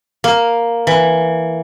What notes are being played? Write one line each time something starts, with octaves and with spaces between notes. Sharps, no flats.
A#3
E3